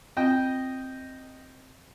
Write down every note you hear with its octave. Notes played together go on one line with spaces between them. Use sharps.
C4 F4 D#5 G5